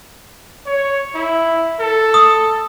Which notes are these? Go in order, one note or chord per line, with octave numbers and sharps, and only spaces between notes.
C#5
E4
A4
D#6